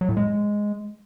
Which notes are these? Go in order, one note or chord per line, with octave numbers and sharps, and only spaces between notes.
F#3
A2
G#3